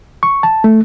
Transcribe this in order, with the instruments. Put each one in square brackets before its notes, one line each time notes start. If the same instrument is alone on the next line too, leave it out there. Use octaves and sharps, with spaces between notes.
[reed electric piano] C#6
A5
A3